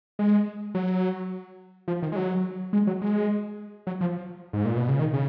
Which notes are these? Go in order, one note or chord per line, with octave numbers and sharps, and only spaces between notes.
G#3
F#3
F3
D#3
G#3
F#3
G#3
F#3
G#3
F#3
F3
G#2
A#2
B2
C#3
D#3
C#3